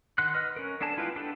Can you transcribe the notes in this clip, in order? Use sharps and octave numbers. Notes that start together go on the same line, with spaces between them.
D#3 F#5 C6 F#6
B4 D#5 F6
C#4 A#4
B3 D4 A4 G#5 A5
G#3 E4 F4 B4 G5
B3 D4 G4 A4 B4